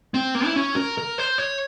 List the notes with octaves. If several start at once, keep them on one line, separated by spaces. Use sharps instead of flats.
C4
A#3
E4
C#4
A#4
A#4
C5
C#5